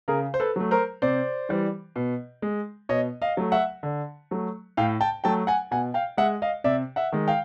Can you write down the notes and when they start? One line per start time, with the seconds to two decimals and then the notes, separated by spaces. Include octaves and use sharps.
0.08 C#3 G#4 A#4
0.34 C5
0.40 A4 B4
0.56 F#3 A3
0.71 A#4 C5
1.02 C3 C5 D5
1.49 E3 G3
1.96 B2
2.42 G#3
2.89 B2 C#5 D#5
3.22 D#5 F5
3.37 F#3 A3
3.52 E5 F#5
3.83 D3
4.31 F#3 A3
4.77 A2 F5 G5
5.01 G5 A5
5.24 F#3 A3 G5 A5
5.47 F#5 G#5
5.71 B2 F#5 G#5
5.94 F5 G5
6.17 G#3 E5 F#5
6.42 D#5 F5
6.64 C3 D5 E5
6.96 E5 F#5
7.12 D#3 G#3
7.28 F5 G5